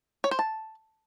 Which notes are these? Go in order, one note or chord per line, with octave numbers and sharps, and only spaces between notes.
C#5
C5
A5